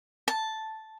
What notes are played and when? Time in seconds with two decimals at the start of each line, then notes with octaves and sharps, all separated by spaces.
0.28 A5